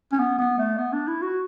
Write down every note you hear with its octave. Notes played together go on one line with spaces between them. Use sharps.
C#4
B3
B3
A3
B3
D4
E4
F#4